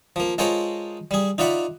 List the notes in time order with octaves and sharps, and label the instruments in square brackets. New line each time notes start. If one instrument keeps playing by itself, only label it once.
[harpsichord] F3 A#3
G#3 F4 A4 A#4 C5 C#5
G3 G#4
D#4 F4 D5 E5 F#5 B5